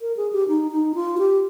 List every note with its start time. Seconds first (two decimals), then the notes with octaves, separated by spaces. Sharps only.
0.01 A#4
0.17 G#4
0.33 G4
0.48 D#4
0.71 D#4
0.95 F4
1.18 G4